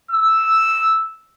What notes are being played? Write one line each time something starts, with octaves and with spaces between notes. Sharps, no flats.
E6